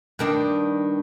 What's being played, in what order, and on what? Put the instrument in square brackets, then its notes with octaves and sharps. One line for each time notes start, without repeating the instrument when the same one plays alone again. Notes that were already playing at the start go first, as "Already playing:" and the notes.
[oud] G2 D#3 D4